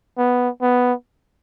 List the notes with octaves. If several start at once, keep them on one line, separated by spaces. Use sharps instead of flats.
B3
B3